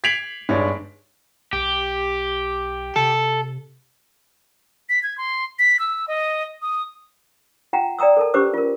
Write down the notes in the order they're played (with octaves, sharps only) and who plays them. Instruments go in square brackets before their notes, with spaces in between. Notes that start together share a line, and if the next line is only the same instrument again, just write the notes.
[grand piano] G#6 B6 C7 D7 F7 F#7
G1 G#3 D4 D#4 C#5
[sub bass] B1 [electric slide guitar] G4
[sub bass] C3 [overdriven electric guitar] A4
[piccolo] B6
G#6
C6
B6
E6
D#5
D#6
[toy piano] F4 F#5 G5 A#5
D5 G5 A#5 D#6 E6
A4 A#4 A5
C#4 G4 B4 C5 D6 E6
F4 A#4